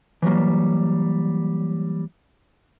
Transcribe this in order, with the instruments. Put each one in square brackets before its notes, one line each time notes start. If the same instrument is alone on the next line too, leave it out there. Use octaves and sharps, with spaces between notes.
[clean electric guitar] E3 F#3 G3 A#3